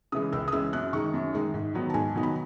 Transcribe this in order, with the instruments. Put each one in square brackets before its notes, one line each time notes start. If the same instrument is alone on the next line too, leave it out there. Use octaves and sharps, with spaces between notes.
[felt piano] C#3 E3 G#3 D#6
C#2 E6
D#6
C#3 E3 G#3 E6
F#2 F#6
D#3 G#3 D#4 C#6
F#2
D#3 G#3 D#4
G#2
D#3 F#3 B3 D#4
A5
G#2 G#5
D#3 F#3 B3 D#4
B5